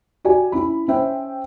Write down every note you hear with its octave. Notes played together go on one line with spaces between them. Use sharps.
F#4 G4 D5 G#5
C#4 E4 B5
C#4 C5 E5 G5